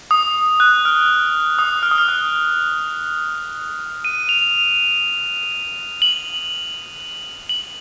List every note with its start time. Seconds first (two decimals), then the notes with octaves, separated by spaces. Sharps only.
0.11 D#6
0.60 F#6
0.85 F6
1.59 D#6
1.83 F6
1.91 D#6
1.98 F6
2.08 F#6
4.05 D#7
4.29 F7
6.02 F#7
7.49 F#7